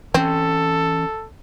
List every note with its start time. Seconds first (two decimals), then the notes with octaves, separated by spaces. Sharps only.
0.14 E3 C4 C#4 A4